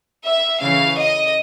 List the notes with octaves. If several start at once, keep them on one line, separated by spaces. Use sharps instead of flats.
E5
C#3 E3 F5
D#5